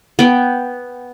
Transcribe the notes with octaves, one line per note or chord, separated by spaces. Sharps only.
B3 G5